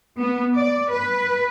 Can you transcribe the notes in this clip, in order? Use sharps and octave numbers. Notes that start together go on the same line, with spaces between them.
B3
D5
B4